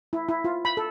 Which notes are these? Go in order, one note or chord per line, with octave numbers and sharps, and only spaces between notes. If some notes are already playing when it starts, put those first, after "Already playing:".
E4
E4
F4
B5
A4